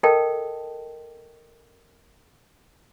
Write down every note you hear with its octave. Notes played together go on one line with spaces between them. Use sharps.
A4 A#4 D#5 G5 A5